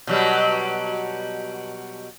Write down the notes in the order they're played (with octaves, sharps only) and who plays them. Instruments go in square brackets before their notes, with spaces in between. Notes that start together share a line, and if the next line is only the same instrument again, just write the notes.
[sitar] B2 F#3 G3